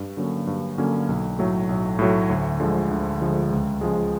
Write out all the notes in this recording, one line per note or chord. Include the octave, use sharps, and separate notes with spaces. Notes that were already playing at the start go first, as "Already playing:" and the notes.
Already playing: G2
D3 F#3 A#3 C#4
G2
D3 F#3 A#3 C#4
B1
A2 F#3 A3
B1
A2 F#3 A3
D2
D3 F3 G#3
D2
D3 F3 G#3
C#2
C#3 F3 G#3